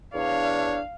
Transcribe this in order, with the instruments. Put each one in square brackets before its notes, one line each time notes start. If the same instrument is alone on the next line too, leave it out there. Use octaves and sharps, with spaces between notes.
[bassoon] E2 [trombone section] D4 [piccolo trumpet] C#5 [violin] F5